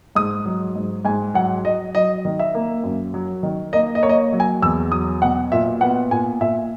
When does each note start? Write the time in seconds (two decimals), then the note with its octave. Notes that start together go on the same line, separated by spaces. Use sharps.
0.15 G#2 D#6
0.46 F#3
0.75 G#2
1.05 G#2 G#5
1.34 F#3 F#5
1.65 F#3 D#5
1.95 F#3 D#5
2.25 D#3
2.39 E5
2.55 A#3
2.84 F#2
3.14 F#3
3.43 D#3
3.73 A#3 D#5
3.95 D#5
4.02 A#3 C#5
4.09 D#5
4.33 F#3
4.40 G#5
4.62 E2 E6
4.92 F#3 D#6
5.22 B2 F#5
5.52 A#2 E5
5.81 B3 F#5
6.11 A#2 G#5
6.41 A#2 E5